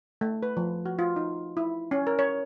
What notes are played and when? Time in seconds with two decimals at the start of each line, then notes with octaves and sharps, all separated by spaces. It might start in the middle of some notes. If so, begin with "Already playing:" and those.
0.21 A3
0.43 B4
0.57 F3
0.86 F#4
0.99 F4
1.16 D#4
1.57 E4
1.91 C#4
2.07 A#4
2.19 C#5